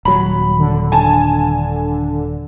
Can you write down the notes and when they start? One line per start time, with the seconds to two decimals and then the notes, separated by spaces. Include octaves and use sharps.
0.05 D#1 F#3 B5
0.59 D3
0.92 G#5 A5